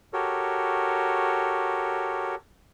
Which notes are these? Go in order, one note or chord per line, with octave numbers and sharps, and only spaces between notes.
F#4 G4 A4 A#4 C#5